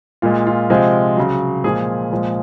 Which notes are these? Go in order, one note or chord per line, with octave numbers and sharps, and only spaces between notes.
A#2 G#3 F4
F4
C3 F3 G#3
C#3 F#3
A#2 F3 G#3 G#4
A#2 F3 G#3